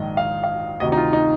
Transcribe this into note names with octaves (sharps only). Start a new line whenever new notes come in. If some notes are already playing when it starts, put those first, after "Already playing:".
Already playing: A#1 G#2 D#3 D#5
F5
F5
D2 C3 D#3 D#5
D#4
F4
D#4